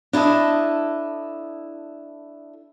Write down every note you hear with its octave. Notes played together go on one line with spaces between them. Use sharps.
D4 E4 A4 D#5